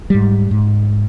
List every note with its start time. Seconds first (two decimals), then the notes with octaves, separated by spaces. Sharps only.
0.10 G#2 G3
0.51 G#2